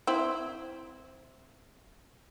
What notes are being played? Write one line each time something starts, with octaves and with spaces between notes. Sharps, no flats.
C4 E4